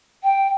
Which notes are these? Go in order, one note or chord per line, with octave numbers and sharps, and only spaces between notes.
G5